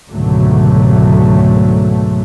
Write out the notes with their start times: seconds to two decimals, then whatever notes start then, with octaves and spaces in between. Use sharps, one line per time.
0.11 C#2 G#2 B2 D3 F#3 A3